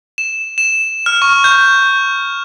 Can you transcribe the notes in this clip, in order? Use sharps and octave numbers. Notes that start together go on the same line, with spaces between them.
E7
E7
F6
C#6
G6